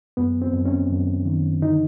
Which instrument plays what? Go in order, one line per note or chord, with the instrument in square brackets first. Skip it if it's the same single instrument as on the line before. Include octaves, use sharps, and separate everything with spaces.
[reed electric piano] F#2 B3
C4
F#2
C#4
F#2
D#3
D3 D#4